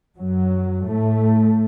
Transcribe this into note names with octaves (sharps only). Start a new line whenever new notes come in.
F#2 F#3
A2 A3